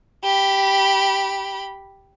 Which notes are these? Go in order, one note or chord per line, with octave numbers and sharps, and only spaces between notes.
G4 B5